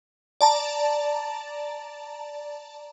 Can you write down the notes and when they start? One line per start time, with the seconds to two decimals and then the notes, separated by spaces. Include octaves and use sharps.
0.41 D5 A5 A#5